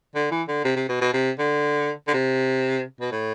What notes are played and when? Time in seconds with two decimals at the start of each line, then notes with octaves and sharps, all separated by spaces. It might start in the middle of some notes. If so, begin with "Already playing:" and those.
0.15 D3
0.31 E3
0.48 D3
0.65 C3
0.76 C3
0.89 B2
1.01 B2
1.13 C3
1.39 D3
2.08 D3
2.14 C3
3.01 B2
3.12 A2